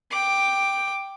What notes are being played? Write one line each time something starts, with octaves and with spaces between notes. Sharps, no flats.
G5 D6